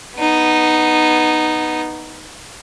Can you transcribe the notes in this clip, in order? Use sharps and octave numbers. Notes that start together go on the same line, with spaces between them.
B3 D#4